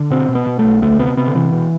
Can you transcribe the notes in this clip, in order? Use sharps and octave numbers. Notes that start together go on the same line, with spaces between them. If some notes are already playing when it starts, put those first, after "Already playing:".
Already playing: D3
B2 C4
B2
B3
B2
B1 A3
D2 A3
C3 B3
C3 B3
D3
C3 E3
B2